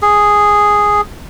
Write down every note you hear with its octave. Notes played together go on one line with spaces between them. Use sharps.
G#4